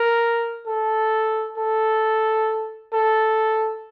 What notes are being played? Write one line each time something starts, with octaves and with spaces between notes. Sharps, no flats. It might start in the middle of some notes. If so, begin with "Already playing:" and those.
Already playing: A#4
A4
A4
A4